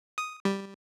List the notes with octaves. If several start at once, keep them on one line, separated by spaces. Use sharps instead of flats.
D#6
G3